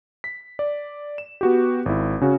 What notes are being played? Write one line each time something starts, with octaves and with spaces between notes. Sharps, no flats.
B6
D5
E7
B3 F#4 G4
G#1 E4
C#3 C#4 F#4